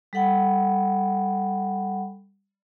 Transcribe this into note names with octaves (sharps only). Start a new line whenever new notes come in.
G3 A4 F#5 G5 B5